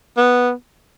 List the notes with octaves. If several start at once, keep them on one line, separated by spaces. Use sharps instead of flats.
B3